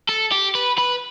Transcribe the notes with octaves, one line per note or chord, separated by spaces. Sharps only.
A4
G4
B4
B4